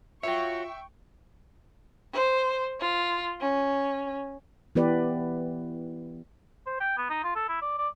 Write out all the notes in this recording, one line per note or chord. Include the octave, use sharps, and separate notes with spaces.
F4 F#4 C#5 E5 G5 C#6
C5
F4
C#4
E3 B3 G4 B4 D5
C5
G5
B3
D#4
F4
A4
E4
D5
D5